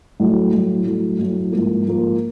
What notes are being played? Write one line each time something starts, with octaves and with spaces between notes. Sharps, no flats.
A2 F#3 A3
A2 F#3 A3
A2 F#3 A3
A2 F#3 A3
G#2 F3 A#3
G#2 F3 A#3